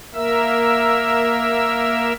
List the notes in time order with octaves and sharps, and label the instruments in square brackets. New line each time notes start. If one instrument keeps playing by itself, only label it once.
[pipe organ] A#3 A#4 E5 E6